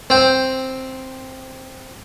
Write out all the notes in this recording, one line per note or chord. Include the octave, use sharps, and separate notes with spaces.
C4 G5